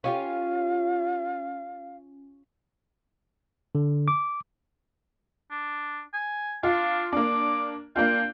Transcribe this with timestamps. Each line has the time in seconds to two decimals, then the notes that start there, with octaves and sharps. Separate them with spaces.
0.04 C#4 F4 G4 F5
3.75 D3
4.08 D6
5.51 D4
6.14 G#5
6.63 D4 F4
7.13 A#3 D4 D6
7.96 A#3 D4 F4 G5